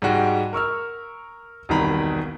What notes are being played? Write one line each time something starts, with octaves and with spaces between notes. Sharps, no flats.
G#2 G3 G#3 F#4 G5
A#4 C#6 E6 F6
E1 C2 D#3 A#5 B5